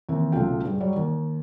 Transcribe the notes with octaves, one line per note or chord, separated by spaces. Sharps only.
D#2 E3 C4
B1 C#3 A3 F4 G5
G2 G#4
F#3 G3 C#5 D5
D#2